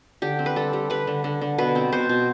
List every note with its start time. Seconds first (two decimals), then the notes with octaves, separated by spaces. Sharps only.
0.22 D3 G4
0.39 C4
0.46 B4
0.56 G3 A4
0.73 G3
0.90 G3 B4
1.07 D3
1.24 D3
1.41 D3
1.58 B2 B4
1.75 C4
1.92 B2 C5
2.09 B2